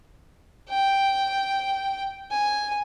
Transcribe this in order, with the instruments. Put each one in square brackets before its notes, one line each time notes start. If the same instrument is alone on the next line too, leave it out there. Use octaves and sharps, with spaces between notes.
[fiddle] G5
G#5